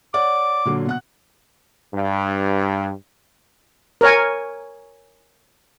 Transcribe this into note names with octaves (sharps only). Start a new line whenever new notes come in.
C#5 D5 F#5 D6
A#2 D3 F#3
B2 F#5 F#6
G2
A#4 C#5 G#5